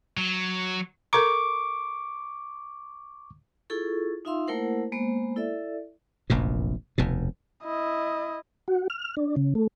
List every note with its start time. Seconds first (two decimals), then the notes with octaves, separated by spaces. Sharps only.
0.17 F#3
1.13 A4 A#4 A#5 C#6 D6
3.70 E4 F4 G#4 A4 C#6
4.25 D#4 F4 E5 F5 C6 E6
4.47 A3 A#3 E4 A#4 C5 F#5
4.92 G#3 A#3 B3 C5
5.36 E4 A4 D5 E5
6.30 F1 A#1 F#2 A#2
6.98 F1 D#2 B2
7.63 E4 D#5
8.68 F#4
8.90 F6
9.17 D4
9.36 C#3
9.55 A3